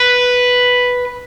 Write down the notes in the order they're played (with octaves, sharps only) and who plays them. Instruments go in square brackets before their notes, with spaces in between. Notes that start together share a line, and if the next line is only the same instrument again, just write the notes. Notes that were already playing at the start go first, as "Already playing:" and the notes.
Already playing: [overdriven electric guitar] B4